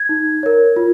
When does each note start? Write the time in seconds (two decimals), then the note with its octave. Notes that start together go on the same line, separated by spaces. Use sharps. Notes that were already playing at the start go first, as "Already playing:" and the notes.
Already playing: G#6
0.09 D#4
0.43 A#4 C#5
0.76 F4